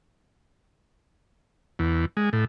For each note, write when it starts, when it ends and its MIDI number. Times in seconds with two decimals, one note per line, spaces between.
1.79 2.05 40
2.17 2.30 56
2.33 2.45 45